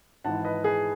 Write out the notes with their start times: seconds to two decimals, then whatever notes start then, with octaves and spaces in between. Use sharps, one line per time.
0.24 G#1 G#2 E3 F#5 A5
0.45 B4 D#5
0.64 G#4 B4